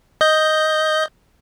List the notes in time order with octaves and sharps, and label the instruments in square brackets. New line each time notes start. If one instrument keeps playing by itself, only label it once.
[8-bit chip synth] D#5 G6